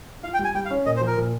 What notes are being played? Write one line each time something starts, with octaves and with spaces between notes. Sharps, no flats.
F4 F5
G5
G3
G#5
G3 G5
F5
C#4
A#2 D#5
C5
F3
A#4
A#2